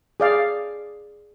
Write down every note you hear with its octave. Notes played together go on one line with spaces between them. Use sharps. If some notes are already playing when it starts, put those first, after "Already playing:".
G#4 D5 F5